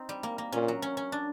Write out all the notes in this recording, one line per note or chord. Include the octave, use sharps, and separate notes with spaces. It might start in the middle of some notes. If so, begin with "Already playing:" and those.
Already playing: C4 D#4
G3
A#3
A#3
A#2 C#4
F#3
C#4
C#4
D4